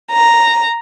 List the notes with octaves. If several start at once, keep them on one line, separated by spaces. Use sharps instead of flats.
A#5